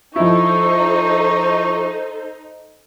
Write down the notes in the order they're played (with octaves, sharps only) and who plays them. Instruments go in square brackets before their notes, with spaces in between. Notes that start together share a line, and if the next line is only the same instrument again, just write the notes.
[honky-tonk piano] F3 E4 [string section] D#4 [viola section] A4 C5 [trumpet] C#6